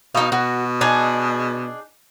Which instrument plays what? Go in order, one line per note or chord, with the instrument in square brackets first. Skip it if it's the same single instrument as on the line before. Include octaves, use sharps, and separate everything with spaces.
[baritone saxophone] B2 [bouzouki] D#4 F5
[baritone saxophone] B2 [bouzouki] F#4
[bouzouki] D4 D#4 G#4